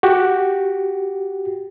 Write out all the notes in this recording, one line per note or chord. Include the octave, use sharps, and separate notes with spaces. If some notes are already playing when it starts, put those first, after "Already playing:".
F#4 G4